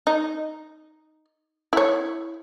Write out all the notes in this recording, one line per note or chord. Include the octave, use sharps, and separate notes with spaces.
D#4
E4 C#5